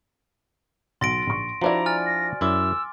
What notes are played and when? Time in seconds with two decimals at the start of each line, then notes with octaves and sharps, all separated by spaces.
1.01 B1 C6 A6 A#6 D7
1.27 A#1 C#6
1.62 F3 D4 E4 F#4 C5 D5 A#5
1.86 G#5 F6 A6
2.06 A#6
2.41 F#2 E4 C6 D6 E6